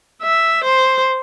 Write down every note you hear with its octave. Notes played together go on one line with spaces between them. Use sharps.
E5
C5